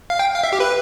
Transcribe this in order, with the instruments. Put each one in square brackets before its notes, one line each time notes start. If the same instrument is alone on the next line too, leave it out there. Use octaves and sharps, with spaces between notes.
[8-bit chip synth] F5
G5
F5
E5
G4
B4